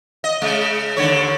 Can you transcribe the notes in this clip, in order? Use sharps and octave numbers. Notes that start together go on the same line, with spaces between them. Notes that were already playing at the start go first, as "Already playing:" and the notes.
D#5
C#3 G#3
D#2 D3 C#5